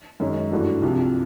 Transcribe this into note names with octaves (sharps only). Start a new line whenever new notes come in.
F#2 D#3 G#3 C#4
G2 E3 A3 D4 F#4
C2 C3 F3